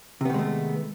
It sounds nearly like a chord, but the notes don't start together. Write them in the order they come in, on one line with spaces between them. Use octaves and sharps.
C3 B3 D#3 G#3 A3